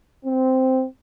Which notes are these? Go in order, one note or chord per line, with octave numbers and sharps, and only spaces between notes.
C4